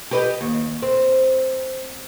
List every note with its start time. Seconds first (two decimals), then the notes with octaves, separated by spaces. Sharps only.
0.11 G4 B4 D#5
0.41 D#2
0.82 C4